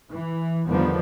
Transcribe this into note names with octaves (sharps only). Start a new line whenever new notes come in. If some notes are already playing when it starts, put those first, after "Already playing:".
E3
E2 D3 D#3 F3 G3 B3